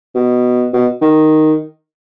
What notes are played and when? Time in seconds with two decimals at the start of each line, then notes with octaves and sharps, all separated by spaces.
0.15 B2
0.74 B2
1.02 D#3